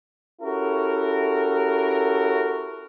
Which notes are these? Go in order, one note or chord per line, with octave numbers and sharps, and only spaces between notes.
C#4 E4 F#4 G4 A4 A#4